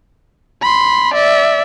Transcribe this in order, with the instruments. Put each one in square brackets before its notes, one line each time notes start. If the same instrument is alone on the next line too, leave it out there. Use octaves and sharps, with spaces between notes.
[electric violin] B5 C6
D5 E5